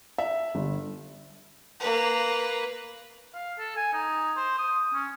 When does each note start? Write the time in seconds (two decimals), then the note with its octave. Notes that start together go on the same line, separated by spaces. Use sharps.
0.18 E5
0.55 G1
1.80 A#3 B4
3.35 F5
3.59 A4
3.76 G#5
3.93 D#4
4.37 C5
4.58 D#6
4.94 C#4